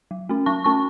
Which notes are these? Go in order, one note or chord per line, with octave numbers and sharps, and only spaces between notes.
F#3
A3 C#4
F#3 A5 C#6
A3 C#4 A5 C#6